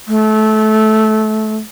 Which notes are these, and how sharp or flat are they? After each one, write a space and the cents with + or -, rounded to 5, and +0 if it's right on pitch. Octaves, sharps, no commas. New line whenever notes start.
A3 -20